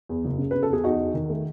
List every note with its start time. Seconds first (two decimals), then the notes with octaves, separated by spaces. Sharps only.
0.09 E2
0.25 F#1
0.38 C#3
0.51 C#3 B4
0.63 A4
0.70 E2 G#4
0.84 E2 D#4 F#4
1.00 E2
1.14 D#3
1.30 A3